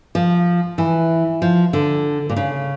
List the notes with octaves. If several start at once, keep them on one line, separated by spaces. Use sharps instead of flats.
F3
E3
F3
D3
A#2
C#3